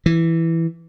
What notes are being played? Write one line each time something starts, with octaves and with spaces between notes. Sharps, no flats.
E3